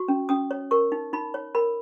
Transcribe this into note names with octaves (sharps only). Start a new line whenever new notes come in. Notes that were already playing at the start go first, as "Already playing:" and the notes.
Already playing: F#4 C#6
C#4
C#4 D#6
C#5
A#4 C#6
D#4
D#4 B5
C#5
A#4 B5